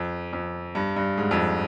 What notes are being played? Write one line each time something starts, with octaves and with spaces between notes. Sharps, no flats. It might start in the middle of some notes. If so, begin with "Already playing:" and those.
Already playing: F2
F2
G2
G2
G#2
F2